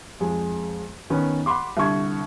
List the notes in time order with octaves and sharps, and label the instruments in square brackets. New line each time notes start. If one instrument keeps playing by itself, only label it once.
[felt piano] F2 G#3
D#3 B3 C#4
F#5 B5 C6 D6
C2 D3 C#6 G#6